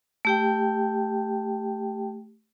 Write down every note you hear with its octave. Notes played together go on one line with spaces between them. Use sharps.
A3 G4 G5